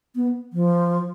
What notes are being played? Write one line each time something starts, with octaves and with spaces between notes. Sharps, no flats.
B3
F3